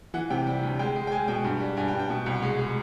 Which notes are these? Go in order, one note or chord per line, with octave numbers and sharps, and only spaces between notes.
E3 F#5
C3 G5
G3 G5
D2
G#3 G5
G#3
G5
G#3 G#5
B2 G5
G2
G3
G2 G#5
G5
G2
G5
B2
C2
G#3
G#3